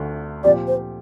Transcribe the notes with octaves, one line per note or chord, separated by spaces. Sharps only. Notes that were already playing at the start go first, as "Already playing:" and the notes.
Already playing: D2 D3 A3 D4
A#2 F3 C4 G4 D5
C5